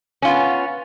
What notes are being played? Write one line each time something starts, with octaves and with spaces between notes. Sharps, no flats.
B3 C#4 F4